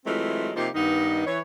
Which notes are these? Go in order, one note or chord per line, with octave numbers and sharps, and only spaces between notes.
E3 F#3 G#3 A3 C4 F4
C3 F3 A#3 D#4 F4 G4
G2 D#3 B3 D#4
E3 C#5